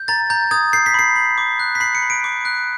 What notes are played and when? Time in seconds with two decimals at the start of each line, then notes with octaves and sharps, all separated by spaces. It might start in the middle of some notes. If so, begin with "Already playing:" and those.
Already playing: G6
0.08 A#5 A6
0.30 A#5 G6
0.51 D#6 G#6
0.73 G6 C7
0.86 B6
0.94 B5 C7
1.16 B5
1.38 D6
1.59 F#6
1.75 B6
1.80 B5 C7
1.95 C#7
2.02 B5
2.10 D7
2.24 D6
2.45 F#6